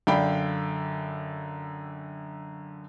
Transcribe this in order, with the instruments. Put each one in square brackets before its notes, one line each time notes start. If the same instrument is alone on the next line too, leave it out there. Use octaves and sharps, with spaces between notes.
[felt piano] F#2 D3 D5 F5 G5 B5